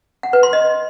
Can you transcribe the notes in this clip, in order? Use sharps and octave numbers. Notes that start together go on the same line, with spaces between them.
F#5
B4
C6
D#5